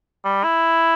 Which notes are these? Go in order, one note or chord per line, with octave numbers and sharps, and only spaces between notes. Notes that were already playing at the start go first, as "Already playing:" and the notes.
G3
E4